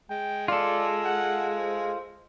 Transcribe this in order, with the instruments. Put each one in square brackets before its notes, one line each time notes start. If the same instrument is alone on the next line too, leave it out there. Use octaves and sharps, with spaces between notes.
[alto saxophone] G#3 [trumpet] G5
[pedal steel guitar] F4 A4 [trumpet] D5
[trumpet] F#5
C5